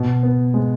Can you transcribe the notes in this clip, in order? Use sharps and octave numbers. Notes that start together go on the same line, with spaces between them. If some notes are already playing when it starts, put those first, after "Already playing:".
Already playing: B2
B3
G#3